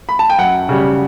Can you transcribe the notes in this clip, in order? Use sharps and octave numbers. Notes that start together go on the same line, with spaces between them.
B5
A5
G5
F#2 F#5
C#3 G3